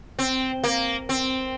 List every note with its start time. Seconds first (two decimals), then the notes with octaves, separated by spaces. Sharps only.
0.19 C4
0.64 A#3
1.09 C4